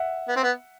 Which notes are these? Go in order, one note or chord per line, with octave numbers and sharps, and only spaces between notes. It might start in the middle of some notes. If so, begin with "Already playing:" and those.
Already playing: E5 F#5
B3
C4
B3